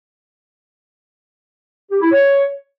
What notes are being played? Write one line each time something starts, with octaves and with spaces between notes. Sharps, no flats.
G4
E4
C#5